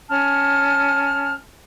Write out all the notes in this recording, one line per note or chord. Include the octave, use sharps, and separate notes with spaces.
C#4 A5 F6